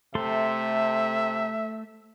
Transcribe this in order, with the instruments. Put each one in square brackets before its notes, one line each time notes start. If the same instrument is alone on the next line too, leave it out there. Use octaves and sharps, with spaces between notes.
[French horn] C3 [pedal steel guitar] A3 A4 C6 [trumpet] E5